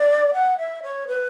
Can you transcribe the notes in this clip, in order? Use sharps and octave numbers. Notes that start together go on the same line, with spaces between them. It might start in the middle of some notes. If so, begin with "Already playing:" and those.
Already playing: D5
F#5
E5
C#5
B4